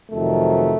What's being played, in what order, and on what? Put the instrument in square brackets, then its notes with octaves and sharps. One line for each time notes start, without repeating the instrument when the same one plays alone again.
[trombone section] F2 C3 D#3 F#3 A3